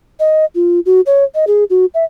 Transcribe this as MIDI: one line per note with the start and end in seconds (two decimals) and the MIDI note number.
0.20 0.45 75
0.55 0.80 65
0.86 1.01 66
1.06 1.24 73
1.35 1.45 75
1.47 1.64 68
1.70 1.85 66
1.94 2.04 76